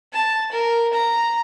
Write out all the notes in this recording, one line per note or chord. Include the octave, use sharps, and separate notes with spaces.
A5
A#4
A#5